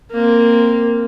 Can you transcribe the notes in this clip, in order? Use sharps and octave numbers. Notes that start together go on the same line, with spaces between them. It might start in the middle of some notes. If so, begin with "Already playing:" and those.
A#3 C4